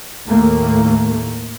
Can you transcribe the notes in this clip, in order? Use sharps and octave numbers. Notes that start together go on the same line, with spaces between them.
D#2 A2 A3 A#3